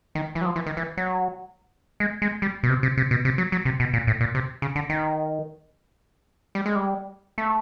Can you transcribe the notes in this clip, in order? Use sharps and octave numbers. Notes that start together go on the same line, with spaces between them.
D#3
E3
F#3
F3
E3
D#3
E3
F#3
G#3
G#3
G3
B2
C3
C3
C3
B2
C3
F#3
F#3
C3
B2
A#2
A2
A#2
C3
C#3
D3
D#3
G3
G#3
G3
A3